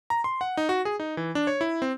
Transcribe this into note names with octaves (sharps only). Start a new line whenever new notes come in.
A#5
C6
F#5
D#4
F#4
G#4
D#4
E3
D4
C#5
E4
C4